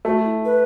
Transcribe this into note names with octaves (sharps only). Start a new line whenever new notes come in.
A3 F#4
E4
B4